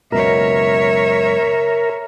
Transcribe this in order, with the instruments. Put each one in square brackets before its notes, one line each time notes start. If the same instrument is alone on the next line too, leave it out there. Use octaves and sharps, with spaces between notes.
[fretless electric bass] F#1 C#2 B2 [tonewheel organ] A#4 [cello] C#5 E5